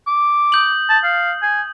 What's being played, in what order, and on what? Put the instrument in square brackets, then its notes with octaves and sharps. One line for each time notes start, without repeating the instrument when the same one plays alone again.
[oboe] D6
[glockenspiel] D#6 G6 F#7
[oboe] A5
F5
G#5